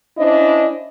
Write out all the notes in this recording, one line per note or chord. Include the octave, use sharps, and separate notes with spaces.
C#4 D4 E4 C5 D#5